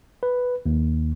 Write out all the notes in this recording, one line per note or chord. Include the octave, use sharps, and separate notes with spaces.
B4
D#2